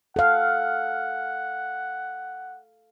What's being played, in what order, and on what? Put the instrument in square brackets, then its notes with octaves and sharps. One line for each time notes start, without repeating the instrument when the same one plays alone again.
[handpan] A4 F5 [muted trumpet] F#5